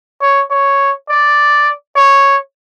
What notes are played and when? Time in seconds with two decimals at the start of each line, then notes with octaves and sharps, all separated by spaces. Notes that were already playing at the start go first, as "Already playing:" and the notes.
0.21 C#5
0.50 C#5
1.09 D5
1.96 C#5